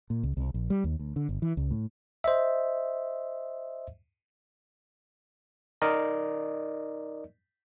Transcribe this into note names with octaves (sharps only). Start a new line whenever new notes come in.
A#2
C#2
C2
A#1
G3
D#2
D2
D3
G1
E3
C#2
A2
C5 D#5 E5
D#4 A#4 D5 D#5